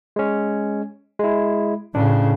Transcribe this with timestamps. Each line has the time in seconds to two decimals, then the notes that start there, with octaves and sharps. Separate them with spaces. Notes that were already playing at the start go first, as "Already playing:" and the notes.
0.16 G#3 C#4
1.19 G#3 E4
1.95 A2 C#3 D4